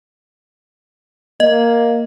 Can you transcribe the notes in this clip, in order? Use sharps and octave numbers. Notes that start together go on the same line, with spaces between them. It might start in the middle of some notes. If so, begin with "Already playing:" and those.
A#3 D#5